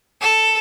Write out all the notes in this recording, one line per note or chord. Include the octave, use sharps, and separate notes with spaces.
A4